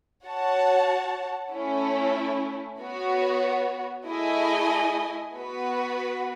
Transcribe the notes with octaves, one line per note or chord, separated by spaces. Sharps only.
F#4 C#5 F#5 A5
A3 C#4 E4
B3 F#4 C#5
A3 E4 G#4 D#5 G#5
B3 F#4 B4